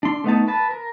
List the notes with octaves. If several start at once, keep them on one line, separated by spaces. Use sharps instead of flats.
D4 C6
A3 B3 D#4 A5
B4 A5
A#4